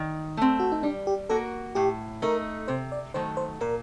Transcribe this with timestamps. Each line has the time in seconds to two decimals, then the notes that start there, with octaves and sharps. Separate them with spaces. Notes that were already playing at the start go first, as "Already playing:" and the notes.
Already playing: D#3
0.37 A3 C4
0.60 F#4
0.72 D#4
0.83 G3 D4
1.07 G4
1.29 A#3 F#4 A4 A#4
1.75 A2 G4
2.22 A3 D#4 A#4
2.68 C3 C5
2.92 D5
3.14 D#3 F#3 A3 C5
3.37 C5
3.61 A#2 A#4